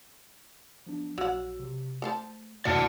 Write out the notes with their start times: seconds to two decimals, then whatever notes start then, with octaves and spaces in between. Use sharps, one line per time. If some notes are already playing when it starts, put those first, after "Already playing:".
0.86 F3 B3 D4
1.18 A#1 F#3 F#4 F#5 E6
1.60 C3
2.02 A3 A4 C5 A5
2.65 D2 A2 A#3 F#4 D5 F#5 A5 F6